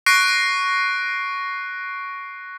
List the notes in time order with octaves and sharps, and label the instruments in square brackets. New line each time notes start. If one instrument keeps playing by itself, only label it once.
[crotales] C#6 F#6 A#6 C7 D7